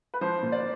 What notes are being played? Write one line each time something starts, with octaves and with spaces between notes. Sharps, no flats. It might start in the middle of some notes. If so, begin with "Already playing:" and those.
B4
F3 C5
A#2
D5